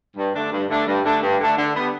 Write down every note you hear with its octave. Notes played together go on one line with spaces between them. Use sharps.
G2
D3 A3 D4
G2
D3 A3 D4
G2
D3 A3 D4
G2
D3 A3 D4
D3
G3 B3